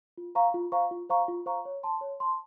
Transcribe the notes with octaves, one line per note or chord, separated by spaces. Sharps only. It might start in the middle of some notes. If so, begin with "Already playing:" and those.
F4
C5 F5 A#5 C#6
F4
C5 F5 A#5 C#6
F4
C5 F5 A#5 C#6
F4
C5 F5 A#5 C#6
C#5
A5 C6
C#5
A5 C6